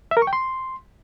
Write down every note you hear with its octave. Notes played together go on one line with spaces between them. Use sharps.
E5
A#4
C#6
G5
C6